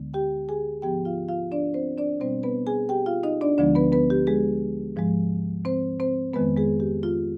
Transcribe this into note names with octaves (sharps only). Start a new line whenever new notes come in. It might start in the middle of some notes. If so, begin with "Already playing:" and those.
Already playing: D2 D3 G#3 B3
G4 G5
G#4 G#5
G#2 F3 B3 G4 G5
F4 F5
F4 F5
D4 D5
C4 C5
D4 D5
B2 G3 B3 C4 C5
B3 B4
G#4 G#5
G4 G5
F4 F5
D#4 D#5
D4 D5
D2 D3 F3 G#3 B3 D4 D5
B3 B4
B3 B4
G4
G#3 G#4
G#2 F3 G#3
C4 C5
C4 C5
F2 D#3 G#3 B3 B4
G#3 G#4
G4
F4